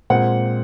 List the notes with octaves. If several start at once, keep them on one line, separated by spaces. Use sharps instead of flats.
A#2 G#3 C4 F#5